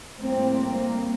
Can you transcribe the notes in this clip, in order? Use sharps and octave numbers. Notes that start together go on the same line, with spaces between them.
A2 G3 A#3 C4
A#3